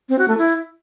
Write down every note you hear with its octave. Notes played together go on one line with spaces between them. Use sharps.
C4
F#4
A3
E4